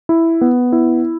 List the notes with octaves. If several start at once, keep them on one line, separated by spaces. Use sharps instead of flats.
E4
B3
E4